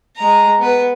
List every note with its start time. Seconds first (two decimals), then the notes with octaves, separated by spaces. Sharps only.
0.17 G#3 A#5
0.59 B3 B4